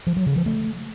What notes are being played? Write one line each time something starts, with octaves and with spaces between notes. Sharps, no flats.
F3
F#3
C#3
F3
A3